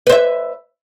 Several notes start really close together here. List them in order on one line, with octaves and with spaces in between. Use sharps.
B4 C5 E5